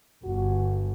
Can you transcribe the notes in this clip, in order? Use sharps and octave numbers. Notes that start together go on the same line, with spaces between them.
G1 F#4